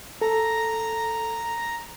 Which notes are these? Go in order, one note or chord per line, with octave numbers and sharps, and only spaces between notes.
A4 A#5